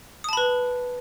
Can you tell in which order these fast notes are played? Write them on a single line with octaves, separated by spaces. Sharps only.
D#6 A5 B5 B4